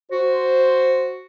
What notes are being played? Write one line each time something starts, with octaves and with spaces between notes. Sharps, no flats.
F#4 C5